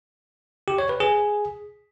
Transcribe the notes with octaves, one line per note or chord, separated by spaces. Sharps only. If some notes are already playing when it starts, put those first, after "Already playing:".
G4
C#5
B4
G#4